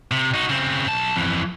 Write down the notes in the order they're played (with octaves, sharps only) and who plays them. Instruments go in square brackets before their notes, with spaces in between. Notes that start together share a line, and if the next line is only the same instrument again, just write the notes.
[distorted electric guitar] C3
D#4 F#4
C#3 C4
B1 A5
F2 E3